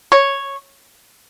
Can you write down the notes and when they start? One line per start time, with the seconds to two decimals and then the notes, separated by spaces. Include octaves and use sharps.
0.12 C#5